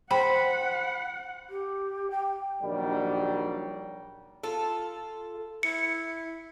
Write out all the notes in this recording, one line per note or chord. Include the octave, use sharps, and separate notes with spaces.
C5 F#5 G5 B5
G4
G5
A#1 D#3 F#3 G3
F4 A4
E4 C#7